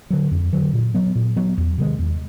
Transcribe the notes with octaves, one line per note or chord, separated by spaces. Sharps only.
D3 F#3
F2
D3 F#3
A#2
F#3 B3
A#2
F#3 B3
E2
C3 D#3 G#3
E2